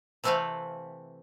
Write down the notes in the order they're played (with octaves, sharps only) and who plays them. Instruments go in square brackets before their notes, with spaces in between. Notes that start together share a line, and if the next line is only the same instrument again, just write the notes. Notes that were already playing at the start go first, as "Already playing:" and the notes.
[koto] C3 E3 A3 C4 B4 F5